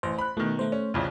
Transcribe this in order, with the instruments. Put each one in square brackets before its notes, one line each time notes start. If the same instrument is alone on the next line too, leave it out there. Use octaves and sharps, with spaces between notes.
[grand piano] A1 [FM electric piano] C5
[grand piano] B5 F#6
[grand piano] B2 D#3 [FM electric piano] A3
[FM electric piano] A3 C5
[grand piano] C#4
C2 F2 C#3